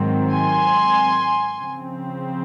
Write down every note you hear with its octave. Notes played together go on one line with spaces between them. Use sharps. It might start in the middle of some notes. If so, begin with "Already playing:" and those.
Already playing: G#2 D#3 F#3 C4
G#5 C6
C#3 F3 C4